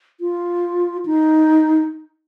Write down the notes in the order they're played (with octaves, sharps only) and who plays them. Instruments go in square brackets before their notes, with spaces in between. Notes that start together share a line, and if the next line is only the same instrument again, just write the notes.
[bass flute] F4
D#4